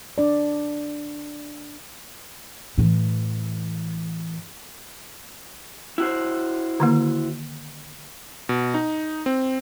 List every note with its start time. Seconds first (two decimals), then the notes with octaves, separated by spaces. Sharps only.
0.18 D4 D5
2.78 A2 E3
5.98 E4 F#4 C5
6.80 D3 D#3 A#3
8.49 B2
8.74 D#4
9.26 C4